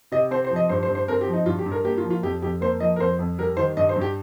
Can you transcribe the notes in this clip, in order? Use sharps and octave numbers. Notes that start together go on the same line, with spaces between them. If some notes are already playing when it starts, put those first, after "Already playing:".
C3 D#5
C4 C5
C5
F3
D#5
G2 C5
C5
G2
C5
C4 A#4
G4
F3
D#4
G2 F4
G4
G2
A#4
A#3 G4
F4
F3
F4
F2 G4
F2 G4
A#3 C5
F3 D#5
A#4
F2 C5
F2
G3 A#4
D#3 C5
G2 D#5
C5
G2
G4